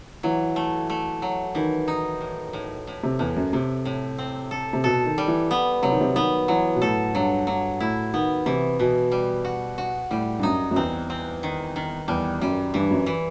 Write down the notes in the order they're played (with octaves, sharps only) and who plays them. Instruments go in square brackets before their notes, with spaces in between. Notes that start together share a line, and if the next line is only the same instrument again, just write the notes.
[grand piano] E3 [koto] F#3
[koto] A3
A3
F#3
[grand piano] D#3 [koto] E3
[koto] D#4
A2
A2
A2
[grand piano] C3
[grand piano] E2 [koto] A2
[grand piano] F#2
[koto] A2 [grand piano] C3
[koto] A2
C4
A4
[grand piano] C3
[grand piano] B2 [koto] A4
[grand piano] D#3
[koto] G3
[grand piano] E3
[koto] B3
[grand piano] C3 [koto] F#3
[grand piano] D#3
C3
[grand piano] D#3 [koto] B3
[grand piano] E3 [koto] F#3
[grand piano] B2
[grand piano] A2 [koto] A4
[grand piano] G2 [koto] F#3
[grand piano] G2 [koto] F#3
[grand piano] A2 [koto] E4
[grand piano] D#3 [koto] B3
[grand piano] C3 [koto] E3
[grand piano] B2 [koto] E3
[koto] G3
F#4
F#4
[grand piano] A2 [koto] G3
[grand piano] G2
[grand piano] F#2 [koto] D#4
[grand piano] F#2
[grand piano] E2 [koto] C4
[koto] C4
D#3
D#3
[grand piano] E2 [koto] G3
[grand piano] F#2 [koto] G3
[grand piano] G2 [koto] E3
[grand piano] F#2
[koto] E3